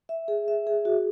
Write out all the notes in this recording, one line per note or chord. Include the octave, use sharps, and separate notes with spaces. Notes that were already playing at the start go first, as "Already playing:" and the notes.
E5
G#4
E5
G#4
F#4